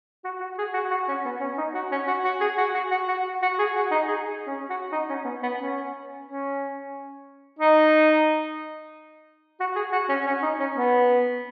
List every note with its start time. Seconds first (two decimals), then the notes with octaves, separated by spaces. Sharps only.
0.25 F#4
0.40 F#4
0.58 G#4
0.74 F#4
0.91 F#4
1.08 C#4
1.25 B3
1.41 C#4
1.57 D#4
1.74 F#4
1.92 C#4
2.07 F#4
2.25 F#4
2.41 G#4
2.58 F#4
2.74 F#4
2.91 F#4
3.08 F#4
3.42 F#4
3.59 G#4
3.76 F#4
3.91 D#4
4.08 G#4
4.47 C#4
4.70 F#4
4.92 D#4
5.09 C#4
5.25 B3
5.43 B3
5.59 C#4
6.25 C#4
7.59 D#4
9.60 F#4
9.76 G#4
9.92 F#4
10.09 C#4
10.27 C#4
10.43 D#4
10.60 C#4
10.76 B3